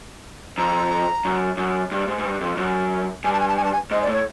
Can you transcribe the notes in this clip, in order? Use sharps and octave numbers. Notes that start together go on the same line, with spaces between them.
F2 A#5
F#2
F#2
G2
G#2
G#2
G2
F2
F#2
G2 G#5
A5
G#5
A5
G#5
A5
G#5
G#2 D#5
D5
A2
C#5